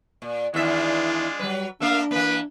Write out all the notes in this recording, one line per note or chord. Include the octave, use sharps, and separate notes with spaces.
A#2
E2 D#3 G#3 D4 E4 F4 E5
F#3 G3 B4
A3 A#3 D4 A#4 E5 F5
E3 A#3 B4